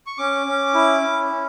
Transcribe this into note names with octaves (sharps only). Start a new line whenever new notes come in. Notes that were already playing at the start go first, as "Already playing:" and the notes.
C#6
C#4 D6
C#4
E4
C#4
C#4